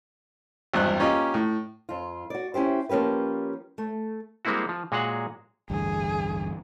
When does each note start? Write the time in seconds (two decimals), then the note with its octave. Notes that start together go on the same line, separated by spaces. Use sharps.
0.74 G#1 E2 G2 C5 F#6
0.99 A#3 C#4 F4 G4 D#5
1.34 A2
1.89 F2 F4
2.30 F#4 D5
2.54 C#4 E4 G4 C5
2.89 F3 A#3 C#4 G4 B4
3.78 A3
4.45 G3 G#3 A#3 C4 E4 F#4
4.69 F3
4.92 A#2 G#3 F#4 G#4 C#5 F#5
5.70 A1 D2 G2 G#4